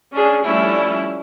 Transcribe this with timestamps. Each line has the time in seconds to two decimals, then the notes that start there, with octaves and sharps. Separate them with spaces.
0.13 C#4 D4 G#4
0.44 F3 G3 A3 C#4 D4 E4